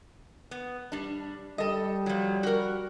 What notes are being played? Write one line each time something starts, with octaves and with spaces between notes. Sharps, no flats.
B3
G3 D4
G3 A4 D#5
F3 F#3
F#4 A#4